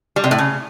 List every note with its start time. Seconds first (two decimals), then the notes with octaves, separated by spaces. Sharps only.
0.16 G3
0.24 C3
0.31 A2
0.38 C#3